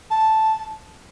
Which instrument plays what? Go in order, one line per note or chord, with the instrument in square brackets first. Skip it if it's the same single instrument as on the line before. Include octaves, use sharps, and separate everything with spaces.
[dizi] A5